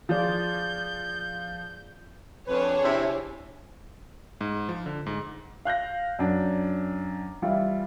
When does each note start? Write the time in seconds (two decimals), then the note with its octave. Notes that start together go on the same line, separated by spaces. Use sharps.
0.09 F3 F4 G#4 D5 G6
2.48 F2 D4 G#4 B4 C#5
2.83 C3 E4
4.41 G#2
4.69 F3
4.86 D3
5.06 G#2
5.65 F5 F#6 G6 A#6
6.19 F#2 D4
7.42 E3 G3 E4 F4